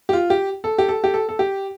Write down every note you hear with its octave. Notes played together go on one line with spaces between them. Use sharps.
G4
F4
G4
A4
G4
A4
G4
A4
A4
G4